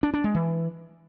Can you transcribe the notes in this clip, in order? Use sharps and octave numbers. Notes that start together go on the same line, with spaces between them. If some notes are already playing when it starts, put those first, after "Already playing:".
D4
D4
G#3
E3